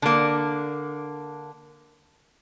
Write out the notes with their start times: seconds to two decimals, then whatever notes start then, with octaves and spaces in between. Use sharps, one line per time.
0.02 D3 A#3